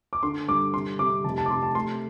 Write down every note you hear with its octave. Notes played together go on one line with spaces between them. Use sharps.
D6
D3 C6
G2 D6
C3 C6
C3 D6
F1 A5
A5
D6
C3 C6
A5
A3 C6